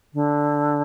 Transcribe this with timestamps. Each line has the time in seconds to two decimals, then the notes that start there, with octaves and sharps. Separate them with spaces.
0.14 D3